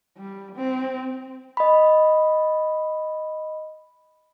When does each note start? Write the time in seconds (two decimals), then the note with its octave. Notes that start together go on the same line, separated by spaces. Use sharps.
0.18 G3
0.55 C4
1.57 D#5 B5